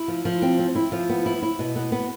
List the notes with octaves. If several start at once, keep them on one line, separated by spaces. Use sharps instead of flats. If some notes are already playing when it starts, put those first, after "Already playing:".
Already playing: E4
F3
F3
C4
C4
E4
F3
B3
E4
E4
B2
B3
B3